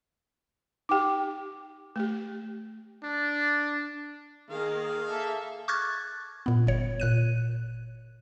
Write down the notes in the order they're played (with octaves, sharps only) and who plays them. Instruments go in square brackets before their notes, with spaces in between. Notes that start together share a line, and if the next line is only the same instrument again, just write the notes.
[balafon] D#4 G4 [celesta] G5 D6
[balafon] A3 G4
[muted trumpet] D4
[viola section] D#3 A#3 [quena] G#4 [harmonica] F5
[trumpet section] A#3 A4 [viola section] E5
[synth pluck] C#6 D6 F6 F#6 G#6 A6
A#2 B3
G1 C#5
A#2 F#6 D#7